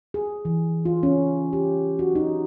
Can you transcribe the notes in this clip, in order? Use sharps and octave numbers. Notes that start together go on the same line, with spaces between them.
G#4
E3
F4
C#4
G4
F#4
D#4